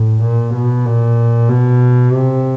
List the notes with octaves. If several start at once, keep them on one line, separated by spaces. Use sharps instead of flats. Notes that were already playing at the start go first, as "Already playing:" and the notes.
Already playing: A2
A#2
B2
A#2
B2
C3